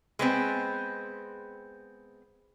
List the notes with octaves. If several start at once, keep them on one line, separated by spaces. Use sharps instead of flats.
G#3 B3 C4